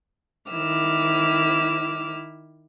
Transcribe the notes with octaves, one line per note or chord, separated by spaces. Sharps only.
D#3 E4 D6 E6 F6